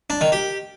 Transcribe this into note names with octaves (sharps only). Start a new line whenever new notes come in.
D4
D#3
G4